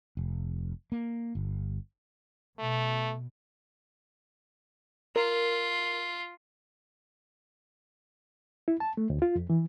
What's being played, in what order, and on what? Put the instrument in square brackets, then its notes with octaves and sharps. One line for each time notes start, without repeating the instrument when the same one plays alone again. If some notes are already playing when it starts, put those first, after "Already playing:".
[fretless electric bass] F1
A#3
G1
[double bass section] B2 [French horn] A3
[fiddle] F4 [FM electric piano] A#4
[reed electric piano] E4
A5
A3
D2
F4
F2
E3